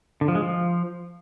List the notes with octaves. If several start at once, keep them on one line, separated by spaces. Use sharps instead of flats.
D3
F3
G#3
F3